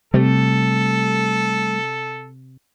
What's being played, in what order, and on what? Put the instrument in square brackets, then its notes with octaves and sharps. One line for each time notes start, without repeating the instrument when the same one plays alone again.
[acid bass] C3 [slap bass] G3 A3 [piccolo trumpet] A4